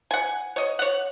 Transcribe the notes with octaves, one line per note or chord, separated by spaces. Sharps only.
F#5 G#5
C#5 D#5
C#5 F#5